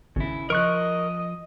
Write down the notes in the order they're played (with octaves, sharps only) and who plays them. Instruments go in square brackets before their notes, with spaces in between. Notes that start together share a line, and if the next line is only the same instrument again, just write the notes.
[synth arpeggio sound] G#1 [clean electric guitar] C#3 E4
[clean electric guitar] F3 [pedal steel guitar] A#4 C#6 F#6 [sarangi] D#5